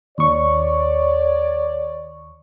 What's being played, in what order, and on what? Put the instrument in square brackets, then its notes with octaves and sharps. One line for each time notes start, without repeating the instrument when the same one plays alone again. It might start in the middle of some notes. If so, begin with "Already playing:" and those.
[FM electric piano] D#2 C#6 [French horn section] C#5 D5